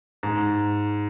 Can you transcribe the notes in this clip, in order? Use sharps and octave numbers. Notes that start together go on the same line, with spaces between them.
G#2